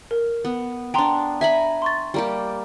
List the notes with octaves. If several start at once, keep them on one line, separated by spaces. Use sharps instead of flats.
A#4
B3
B3 D4 G5 A#5 C6
E5 G#5 A#5 B5
C6 C#6 A6
G3 A#3 G4